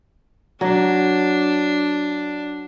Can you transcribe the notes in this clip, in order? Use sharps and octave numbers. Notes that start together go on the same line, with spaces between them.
F#3 D4